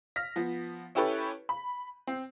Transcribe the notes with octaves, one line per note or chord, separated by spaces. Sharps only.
F6 A#6 B6
F3 B3
C#4 E4 G4 A4 B4 C#5
B5
C4